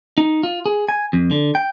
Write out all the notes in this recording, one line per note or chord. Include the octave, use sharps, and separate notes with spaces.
D#4
F4
G#4
G#5
F2
D3
G5